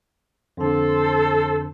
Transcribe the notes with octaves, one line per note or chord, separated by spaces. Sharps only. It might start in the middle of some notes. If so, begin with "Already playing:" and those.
F2 D3 A4 C5 C6